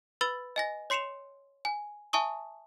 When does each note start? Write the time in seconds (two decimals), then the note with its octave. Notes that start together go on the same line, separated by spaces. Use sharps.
0.21 B4 B5 E6 A6 G7
0.56 D#5 G#5 A#6
0.90 C#5 C6 C7 C#7 E7 F7
1.65 G#5
2.13 E5 G#5 A5 C#6 D#6